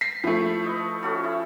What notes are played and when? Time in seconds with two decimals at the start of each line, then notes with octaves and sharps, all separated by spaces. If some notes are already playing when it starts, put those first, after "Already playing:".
0.01 B6 C7
0.24 F3 A3 E4
0.66 B4 D#5
1.03 C#4 F#4 A4
1.24 E4